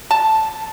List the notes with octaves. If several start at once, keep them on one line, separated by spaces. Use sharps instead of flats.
A5